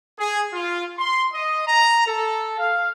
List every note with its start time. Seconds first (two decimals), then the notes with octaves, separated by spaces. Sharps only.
0.18 G#4
0.53 F4
0.98 C6
1.34 D#5
1.68 A#5
2.07 A4
2.58 F5